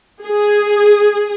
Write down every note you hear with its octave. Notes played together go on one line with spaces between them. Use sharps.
G#4